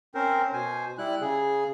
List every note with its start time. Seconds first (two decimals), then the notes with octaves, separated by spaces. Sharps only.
0.15 C4 C#4 A#4 C5
0.53 B2 C5 G#5
0.98 G3 E4 F#6
1.21 C#3 G#4